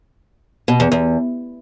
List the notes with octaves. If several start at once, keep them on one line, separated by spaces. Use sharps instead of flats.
B2
E2
E2